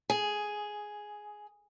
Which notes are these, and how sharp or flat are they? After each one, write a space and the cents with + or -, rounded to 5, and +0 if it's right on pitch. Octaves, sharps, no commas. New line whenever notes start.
G#4 +5